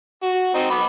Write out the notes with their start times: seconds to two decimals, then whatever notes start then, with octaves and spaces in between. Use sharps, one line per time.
0.22 F#4
0.55 C4 D#4
0.70 B3 B5 D6